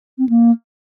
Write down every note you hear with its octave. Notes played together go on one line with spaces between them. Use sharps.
C4
A#3